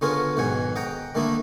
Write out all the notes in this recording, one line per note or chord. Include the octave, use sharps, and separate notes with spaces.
D3 B3 C#4 F4 G#4 A#4
B1 G#2 B2 D#3 F#5 G#5
D#5 F#5 G5 A#5
D3 D#3 A3 A#3 D#4 E4